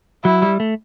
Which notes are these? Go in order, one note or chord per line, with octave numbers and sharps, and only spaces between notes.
F#3 E4
G3
A3